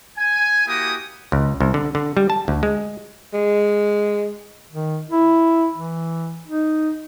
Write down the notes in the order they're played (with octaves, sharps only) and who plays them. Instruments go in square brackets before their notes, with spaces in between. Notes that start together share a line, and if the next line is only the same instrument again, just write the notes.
[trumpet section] G#5
A#3 E4 F#4 G4 G#5 D#6
[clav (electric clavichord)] C#2
C2
D3
D3
G3
A5
D2
G#3
[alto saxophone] G#3
[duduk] D#3
E4
E3
D#4